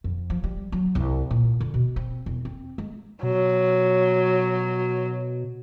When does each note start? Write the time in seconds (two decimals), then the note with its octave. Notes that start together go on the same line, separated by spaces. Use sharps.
0.04 F2
0.30 F3
0.44 G3
0.72 F#3
0.95 C2
1.31 A#2
1.61 D3
1.74 B2
1.96 C4
2.26 E1
2.45 C4
2.78 G#3
3.23 B2 F#3